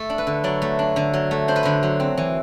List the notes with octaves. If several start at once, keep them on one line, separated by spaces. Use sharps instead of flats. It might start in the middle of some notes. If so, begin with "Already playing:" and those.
Already playing: A3 A4
D4
B4
D3
F#3 D5
A3
D4
D3
F#3
A3
D4 C5
B4
D3 C5
F#3
C4
E3